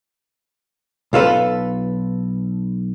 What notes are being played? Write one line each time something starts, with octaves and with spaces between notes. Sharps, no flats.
B1 F4 A4 B4